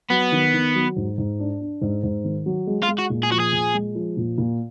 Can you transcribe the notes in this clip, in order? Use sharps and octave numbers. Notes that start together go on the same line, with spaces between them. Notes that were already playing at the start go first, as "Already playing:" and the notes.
F#3 B3
D#3
D#3
F#3
G#2
G#2
D4
D4
G#2
G#2
D#3
F#3
G#3
F4
G#3
F#4
A#2
G#4
F3 F#4
G#4
A#2
G#3
F3
A#2
A#2